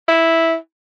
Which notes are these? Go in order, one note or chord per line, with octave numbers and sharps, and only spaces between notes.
E4